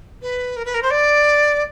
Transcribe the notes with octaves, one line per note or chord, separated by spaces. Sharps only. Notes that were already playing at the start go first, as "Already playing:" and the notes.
B4
A#4
B4
A#4
C5
D5